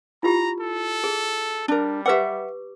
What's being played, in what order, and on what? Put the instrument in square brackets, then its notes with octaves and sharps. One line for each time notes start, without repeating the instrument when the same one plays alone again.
[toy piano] E4 F4 G4 [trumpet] A#5
[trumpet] A4
[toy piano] G#4
[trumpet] G3 [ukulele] D4 A#4
[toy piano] G4 B4 D6 [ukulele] E5 F#5